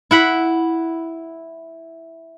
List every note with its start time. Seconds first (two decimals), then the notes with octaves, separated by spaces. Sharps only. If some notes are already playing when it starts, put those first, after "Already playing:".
0.11 E4 F#5 B5